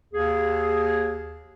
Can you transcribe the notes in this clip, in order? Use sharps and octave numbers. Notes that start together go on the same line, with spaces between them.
D#2 G#4